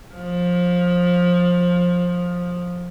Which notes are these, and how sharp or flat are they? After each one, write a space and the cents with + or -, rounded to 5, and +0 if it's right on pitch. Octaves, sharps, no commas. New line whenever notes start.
F3 +20